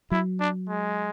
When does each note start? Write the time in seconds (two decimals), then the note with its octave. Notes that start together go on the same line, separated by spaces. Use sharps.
0.11 F#3 E4
0.40 D4
0.69 G#3